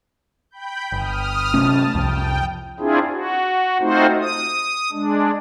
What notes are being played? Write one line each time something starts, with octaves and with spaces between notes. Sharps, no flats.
G5 B5 G6
G1 D#6 F6
C3 A3 C#4 A5
C2 F2 G5
C4 D4 E4 F4 G#4
F#4
A3 C4 D#4 F4 F#4 C5
D#6
G#3 D4